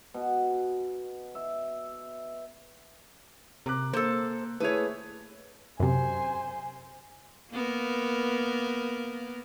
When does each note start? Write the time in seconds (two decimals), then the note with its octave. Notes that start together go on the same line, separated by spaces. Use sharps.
0.14 B2
1.35 E5
3.66 C3 A#4 D6 F#6
3.93 A#3 A4 C5
4.60 A3 E4 G#4 B4 C#5
5.80 F#2 C3 C5 G#5
7.51 A#3 B3 A#4